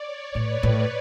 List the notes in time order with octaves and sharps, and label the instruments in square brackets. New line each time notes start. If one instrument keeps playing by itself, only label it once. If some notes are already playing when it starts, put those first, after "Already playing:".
Already playing: [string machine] C#5 D5
[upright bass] A2 [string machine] B4
[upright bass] A2